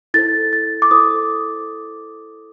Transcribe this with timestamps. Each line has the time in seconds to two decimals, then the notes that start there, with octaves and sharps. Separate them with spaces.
0.14 E4 A4 C5 A6
0.53 A6
0.82 D6
0.91 E4 A4 C5 D#6